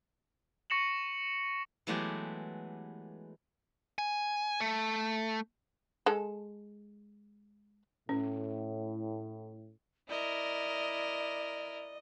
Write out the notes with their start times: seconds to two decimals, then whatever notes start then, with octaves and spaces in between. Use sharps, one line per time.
0.70 C#6 A#6 C#7 E7 F#7
1.87 E3 F#3 G#3 A3 B3 G4
3.99 G#5
4.61 A3
6.06 G#3 A4
8.09 A2 C#4
10.09 E4 A#4 D5 D#5